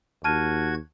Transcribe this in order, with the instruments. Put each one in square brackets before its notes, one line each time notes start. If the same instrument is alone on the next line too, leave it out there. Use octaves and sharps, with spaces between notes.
[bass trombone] D#2 [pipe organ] F#4 G#6 [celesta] A5 F6 D#7